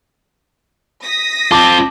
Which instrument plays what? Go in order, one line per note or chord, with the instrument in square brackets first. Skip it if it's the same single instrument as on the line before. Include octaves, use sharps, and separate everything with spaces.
[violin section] D#6 A#6 B6
[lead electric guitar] C4 F4 [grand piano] A5 D6